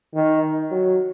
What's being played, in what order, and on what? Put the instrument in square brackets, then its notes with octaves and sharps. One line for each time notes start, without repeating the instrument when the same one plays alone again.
[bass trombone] D#3
F#3